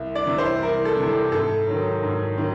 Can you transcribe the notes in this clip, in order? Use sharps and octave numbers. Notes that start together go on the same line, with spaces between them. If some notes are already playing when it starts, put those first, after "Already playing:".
Already playing: C2
D5
C3 E3
C5
C2 A#4
A4
C3 E3
A4
G#2 A4
D#3 F#3
G#2
D#3 F#3